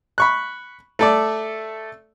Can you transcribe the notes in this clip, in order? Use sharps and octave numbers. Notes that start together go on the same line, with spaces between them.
B5 C#6 F#6
A3 A4 D5